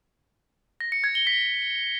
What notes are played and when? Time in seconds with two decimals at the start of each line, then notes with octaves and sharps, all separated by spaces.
0.81 A#6
0.92 C#7
1.04 G#6
1.15 G7
1.27 B6